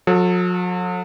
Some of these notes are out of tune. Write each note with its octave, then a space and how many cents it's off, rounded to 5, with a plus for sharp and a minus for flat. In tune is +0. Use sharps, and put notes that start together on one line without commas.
F#3 -45 A4 +0